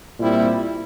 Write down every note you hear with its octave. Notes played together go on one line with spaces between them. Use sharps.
A#2 G3 C4 E4